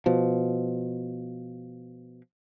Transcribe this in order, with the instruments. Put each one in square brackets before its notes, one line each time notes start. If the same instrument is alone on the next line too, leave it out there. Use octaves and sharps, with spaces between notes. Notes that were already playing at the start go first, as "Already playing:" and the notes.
[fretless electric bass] B2 F3